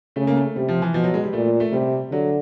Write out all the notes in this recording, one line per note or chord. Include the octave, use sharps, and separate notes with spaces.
C#3 A3
A#3
A3
C3 G3
F3
E3
B2 F3
F#3
G#3
G3
A#2 A3
A3
C3 G3
D3 F#3